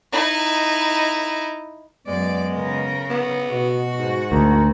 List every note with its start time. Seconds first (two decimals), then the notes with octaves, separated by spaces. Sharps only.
0.12 D#4 E4
2.07 F#2 G#3 B3 D5
2.55 C#3 A#4
3.10 B3
3.52 B2 F#4
3.98 G#2
4.32 D2 A#4